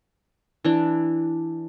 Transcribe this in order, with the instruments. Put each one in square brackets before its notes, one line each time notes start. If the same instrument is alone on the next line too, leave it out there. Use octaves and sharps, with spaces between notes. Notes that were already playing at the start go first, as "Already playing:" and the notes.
[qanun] E3 D4